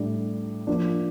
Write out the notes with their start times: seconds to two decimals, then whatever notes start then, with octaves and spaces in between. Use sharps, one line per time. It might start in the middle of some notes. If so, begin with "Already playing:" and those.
Already playing: A2 G3 D4
0.67 F3 A#3 D4